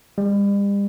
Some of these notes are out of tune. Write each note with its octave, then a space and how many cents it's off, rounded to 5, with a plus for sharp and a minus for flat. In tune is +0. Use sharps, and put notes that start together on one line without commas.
G3 +40